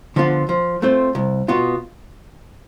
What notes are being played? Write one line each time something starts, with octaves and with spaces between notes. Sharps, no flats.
D3 F3 B3 F4
F3
A3 C4 F4 C5
C2
B2 B3 F4